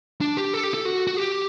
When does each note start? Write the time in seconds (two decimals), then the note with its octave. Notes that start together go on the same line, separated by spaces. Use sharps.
0.21 D4
0.37 G4
0.54 A4
0.63 G4
0.74 A4
0.85 F#4
1.07 F#4
1.17 G4